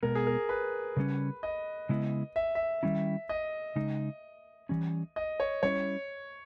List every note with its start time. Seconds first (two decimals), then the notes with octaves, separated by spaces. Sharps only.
0.03 B2 G#3 B3 A#4
0.15 G#4
0.27 A#4
0.49 B4
0.97 C#3 G3 C#4
1.43 D#5
1.89 C#3 G#3 B3 E4
2.36 E5
2.55 E5
2.83 D#3 G3 C#4 E4
3.29 D#5
3.76 C#3 G#3 D#4
4.69 E3 G3 C#4
5.16 D#5
5.40 C#5
5.63 G3 C#4 E4 C#5